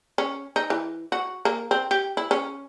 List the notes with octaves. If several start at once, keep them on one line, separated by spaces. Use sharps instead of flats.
C#4
D#4
E3
F#4
A#3
C4
G4
E4
C#4